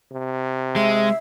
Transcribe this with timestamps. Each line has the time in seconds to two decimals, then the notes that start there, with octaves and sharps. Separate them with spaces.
0.12 C3
0.76 G#3 E5